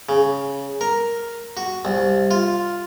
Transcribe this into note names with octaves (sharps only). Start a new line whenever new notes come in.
C#3
A#4
F#4
C2
F4